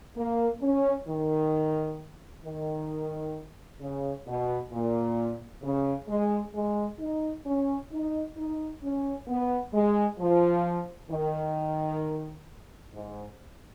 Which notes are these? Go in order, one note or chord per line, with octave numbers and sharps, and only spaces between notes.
A#3
C#4
D#3
D#3
C#3
B2
A#2
C#3
G#3
G#3
D#4
C#4
D#4
D#4
C#4
B3
G#3
F3
D#3
G#2